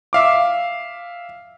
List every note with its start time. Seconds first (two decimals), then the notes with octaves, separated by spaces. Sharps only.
0.13 E5 F5 D6